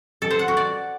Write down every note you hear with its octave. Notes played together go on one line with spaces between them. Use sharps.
A4
C5
F#5
F#4
D5